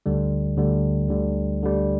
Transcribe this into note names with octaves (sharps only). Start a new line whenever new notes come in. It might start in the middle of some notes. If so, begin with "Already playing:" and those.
D2 D3 G3
D2 D3 G3
D2 D3 G3
D2 D3 G3